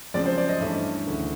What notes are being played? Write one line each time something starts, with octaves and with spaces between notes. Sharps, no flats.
F#2 C#3 F3 G#3 C4 D5
C5
D5
D#5
G2 E3 A3 C#4 E4 E5
D2 C#3 E3